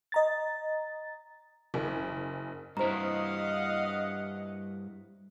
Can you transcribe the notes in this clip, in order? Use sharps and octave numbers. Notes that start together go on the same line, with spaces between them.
D#5 A#5 A6
F#1
G2 E4 C5 D#5 F5 F#5 A#5